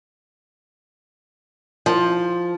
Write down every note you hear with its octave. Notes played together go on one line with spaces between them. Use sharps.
F3